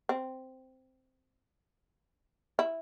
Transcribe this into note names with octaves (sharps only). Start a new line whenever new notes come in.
C4
E4